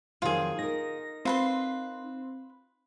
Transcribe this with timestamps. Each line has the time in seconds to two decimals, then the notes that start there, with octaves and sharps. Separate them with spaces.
0.22 F2 D#3 F#3 F4 G#4
0.59 D#4 A#4 A#6
1.25 C4 F4 B4 C6